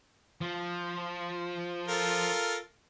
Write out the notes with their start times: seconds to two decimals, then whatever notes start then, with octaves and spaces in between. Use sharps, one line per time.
0.41 F3
1.88 F4 A4 A#4